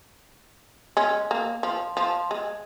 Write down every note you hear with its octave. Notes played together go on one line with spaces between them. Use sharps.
G#3 C#4
A#3
F3
F3
G#3